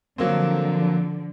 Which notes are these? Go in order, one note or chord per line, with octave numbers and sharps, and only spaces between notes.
D3 F3 F#3 A#3 C4